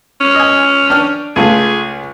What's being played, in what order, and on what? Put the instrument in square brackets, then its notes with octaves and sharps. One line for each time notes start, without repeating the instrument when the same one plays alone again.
[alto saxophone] C#4
[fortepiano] D#5 G#5
D4 G5 F6
[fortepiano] C#2 A3 F4 [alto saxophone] G#4